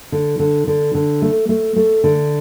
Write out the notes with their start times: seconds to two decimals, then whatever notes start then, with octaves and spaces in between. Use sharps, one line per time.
0.12 D3
0.39 D3
0.67 D3
0.95 D3
1.22 A3
1.49 A3
1.76 A3
2.04 D3